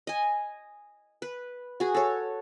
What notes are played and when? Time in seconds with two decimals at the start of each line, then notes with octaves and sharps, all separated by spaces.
0.07 D#5 G#5
1.22 B4
1.80 F#4 G#4
1.94 A4 C#5